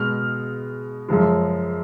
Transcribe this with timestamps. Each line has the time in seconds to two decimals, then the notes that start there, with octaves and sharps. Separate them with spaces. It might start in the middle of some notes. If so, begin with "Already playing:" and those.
Already playing: B2 G#3 F6
1.08 F#2 C#3 F3 G#3